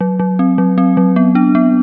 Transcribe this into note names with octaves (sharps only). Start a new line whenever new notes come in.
F#3
F#3
C4
F#3
C4
F#3
B3
D4
B3